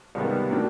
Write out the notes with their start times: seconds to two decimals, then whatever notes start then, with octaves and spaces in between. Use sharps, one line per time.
0.15 C#2 C3 D#3 G3 B3
0.50 A2 F#3 A#3 D4